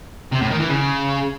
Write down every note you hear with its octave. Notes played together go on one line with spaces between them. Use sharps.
C3
A2
D#3
E3
C#3